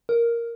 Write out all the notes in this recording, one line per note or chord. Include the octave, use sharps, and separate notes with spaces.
A#4